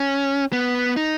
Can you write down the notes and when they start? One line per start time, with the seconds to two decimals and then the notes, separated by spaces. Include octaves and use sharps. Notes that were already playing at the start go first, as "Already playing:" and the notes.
Already playing: C#4
0.53 B3
0.97 D#4